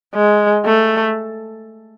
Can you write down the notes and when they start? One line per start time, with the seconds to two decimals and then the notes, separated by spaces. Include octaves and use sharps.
0.14 G#3
0.65 A3